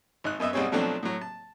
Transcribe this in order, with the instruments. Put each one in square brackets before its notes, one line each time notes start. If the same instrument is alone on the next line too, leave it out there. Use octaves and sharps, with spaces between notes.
[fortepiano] G#1 D#4 F#6
F#2 B3 D#5 E5
B1 G3 C4 G#4 C#5
B2 F3 F#3 A3 C4 D4
A2 F#3
A5